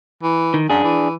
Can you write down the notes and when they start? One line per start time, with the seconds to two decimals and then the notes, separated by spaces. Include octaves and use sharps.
0.23 E3
0.54 D#3
0.70 F#2 D4 G#4
0.84 E3